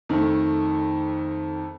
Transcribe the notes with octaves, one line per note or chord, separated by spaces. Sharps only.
F2 D#3 A3